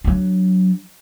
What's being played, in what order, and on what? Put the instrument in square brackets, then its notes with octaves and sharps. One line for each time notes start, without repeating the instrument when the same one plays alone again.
[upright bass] F#3 D4